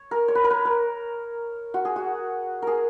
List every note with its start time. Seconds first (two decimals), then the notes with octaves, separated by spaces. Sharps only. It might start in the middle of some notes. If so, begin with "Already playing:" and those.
Already playing: C#5
0.11 A#4
0.28 C#5
0.35 B4
0.44 A#4
0.50 B4
0.65 A#4
1.74 F#4
1.85 G#4
1.96 F#4
2.62 G#4 A#4